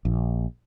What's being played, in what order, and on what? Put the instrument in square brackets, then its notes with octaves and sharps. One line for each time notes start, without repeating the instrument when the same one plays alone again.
[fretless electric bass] A#1